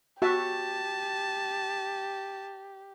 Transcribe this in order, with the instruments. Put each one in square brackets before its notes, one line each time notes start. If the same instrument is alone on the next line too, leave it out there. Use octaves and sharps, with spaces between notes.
[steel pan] F#4 E5 [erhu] G4 [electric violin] A5